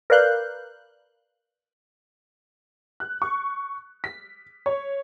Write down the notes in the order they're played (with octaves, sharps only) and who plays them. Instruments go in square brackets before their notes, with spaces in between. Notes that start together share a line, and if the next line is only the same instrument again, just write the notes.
[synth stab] A#4 B4 D5 F5 F#6 G6
[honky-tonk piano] F#6
C#6
B6
C#5